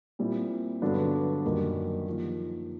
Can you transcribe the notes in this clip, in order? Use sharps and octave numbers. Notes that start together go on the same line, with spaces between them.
A#2 G3 C4 E4
G2 D3 F#3 B3 D4
F#2 D#3 G3 A#3
F3 A#3 D#4